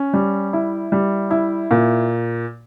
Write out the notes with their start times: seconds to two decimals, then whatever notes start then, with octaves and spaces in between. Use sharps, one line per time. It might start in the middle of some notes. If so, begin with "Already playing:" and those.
Already playing: C#4
0.13 G3
0.53 E4
0.92 G3
1.31 E4
1.71 A#2